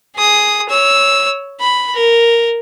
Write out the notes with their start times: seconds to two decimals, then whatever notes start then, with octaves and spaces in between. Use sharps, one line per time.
0.16 G#4 D#6
0.69 C#5 E6
1.60 B5
1.94 A#4